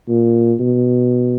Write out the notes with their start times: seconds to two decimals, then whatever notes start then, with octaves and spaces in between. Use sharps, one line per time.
0.09 A#2
0.60 B2